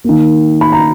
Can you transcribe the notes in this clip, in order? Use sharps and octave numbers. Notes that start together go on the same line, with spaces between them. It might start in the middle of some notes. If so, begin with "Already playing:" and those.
D#3 A#3
B5
A#5